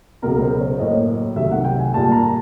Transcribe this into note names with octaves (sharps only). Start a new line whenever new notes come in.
C#2 B2 F#3 B3 A#4
C5
C#5
A2 F#3 A#3 D#5
C2 C3 D#3 F#3 A3 E5
F#5
G5
G#5
A#2 G3 A#3 A5
A#5